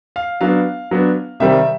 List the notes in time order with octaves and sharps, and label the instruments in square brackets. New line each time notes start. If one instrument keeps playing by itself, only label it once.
[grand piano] F5
F#3 B3 D4 F5
F#3 B3 D4
C3 D#3 G3 C4 E5